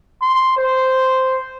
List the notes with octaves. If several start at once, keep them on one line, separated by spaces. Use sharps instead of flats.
C6
C5